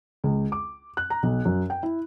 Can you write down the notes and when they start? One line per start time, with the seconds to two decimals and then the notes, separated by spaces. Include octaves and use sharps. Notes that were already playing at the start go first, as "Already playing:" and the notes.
0.24 C#2
0.52 D6
0.97 F#6
1.10 A#5
1.23 B1
1.45 F#2
1.70 G5
1.83 E4